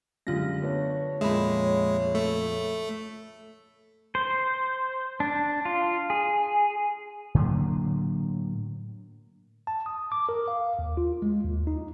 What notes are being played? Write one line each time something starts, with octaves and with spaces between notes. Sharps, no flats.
F#2 D3 G3 G#3 F4 A#6
A3 B3 D4 C#5
F2 A#2 F3 G#3 E5 B5
A3
C5
D4
F4
G#4
A2 D3 F#3 A#3
A5
D#6
D6
A#4
F5
D#2
F4
G#3
D#2
D#4